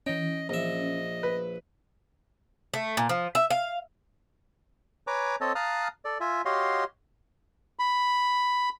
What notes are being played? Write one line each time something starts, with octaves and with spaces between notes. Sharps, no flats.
E3 C#4 D#5 G5
A#1 D#5 E5
B4
A3
A#2
F3
E5
F5
B4 C#5 G#5 A#5 D6
C4 A4 C#5 D#5 A5
F5 A5 A#5 D#6 F6 F#6
A4 D5
F4 E5 G#5
F#4 G4 C#5 D#5 F5 C6
B5